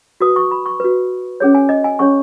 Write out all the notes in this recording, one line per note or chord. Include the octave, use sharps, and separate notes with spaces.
F#4 B4 D#6
C#6
B5
C#6
F#4 B4
C#4 G#4 C#5
G#5
D#5
G#5
C#4 G#4 C#5 C#6